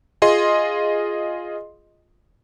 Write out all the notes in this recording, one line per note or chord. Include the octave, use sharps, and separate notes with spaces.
F4 G#4 D#5 C6